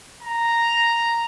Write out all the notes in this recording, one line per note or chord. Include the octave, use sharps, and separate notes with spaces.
A#5